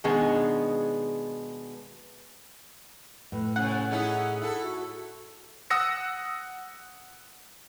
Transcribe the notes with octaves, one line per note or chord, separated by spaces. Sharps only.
B2 D#3 G#3 B3 D4 G#4
A2 B4
C3 C#4 F#5
C#4 D#4 E4 G#4
E4 A4
F#4
F#5 D#6 E6 A#6 C#7